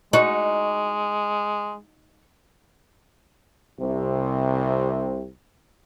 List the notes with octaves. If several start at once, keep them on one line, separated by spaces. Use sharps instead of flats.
G#3 D#4 F#4
C2 C3